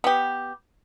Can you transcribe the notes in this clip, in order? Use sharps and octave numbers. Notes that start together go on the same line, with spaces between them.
B3 G4